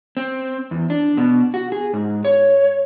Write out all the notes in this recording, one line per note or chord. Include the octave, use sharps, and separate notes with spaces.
C4
E2
D4
B2
F#4
G#4
G#2
C#5